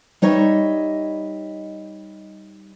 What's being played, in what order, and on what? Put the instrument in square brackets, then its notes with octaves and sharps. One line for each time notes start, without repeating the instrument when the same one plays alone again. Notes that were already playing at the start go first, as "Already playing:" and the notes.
[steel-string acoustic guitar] G3 D#4 C#5 D#5 E5